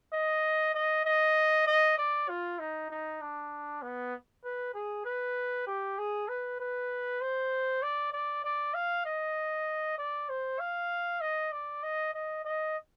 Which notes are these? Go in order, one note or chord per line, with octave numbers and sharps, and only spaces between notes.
D#5
D#5
D#5
D#5
D5
F4
D#4
D#4
D4
B3
B4
G#4
B4
G4
G#4
B4
B4
C5
D5
D5
D5
F5
D#5
D5
C5
F5
D#5
D5
D#5
D#5
D#5